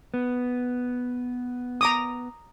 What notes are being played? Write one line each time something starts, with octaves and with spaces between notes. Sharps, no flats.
B3
A#5 D6 D#6